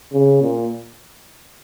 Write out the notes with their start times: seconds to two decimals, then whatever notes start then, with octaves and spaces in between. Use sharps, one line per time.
0.13 C#3
0.42 A#2